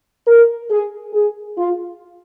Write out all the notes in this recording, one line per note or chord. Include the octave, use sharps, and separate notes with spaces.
A#4
G#4
G#4
F4